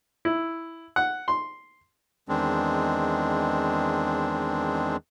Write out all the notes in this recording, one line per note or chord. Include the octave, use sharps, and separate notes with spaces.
E4
F#5
C6
E2 D#3 G#3 C4 D4